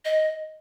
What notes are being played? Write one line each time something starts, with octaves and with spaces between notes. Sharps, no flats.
D#5